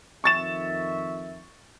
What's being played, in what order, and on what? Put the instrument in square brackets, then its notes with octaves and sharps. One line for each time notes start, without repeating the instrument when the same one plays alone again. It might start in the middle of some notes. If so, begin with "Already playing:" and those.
[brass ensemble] F2 D#3 E5 [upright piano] C#6 A6 E7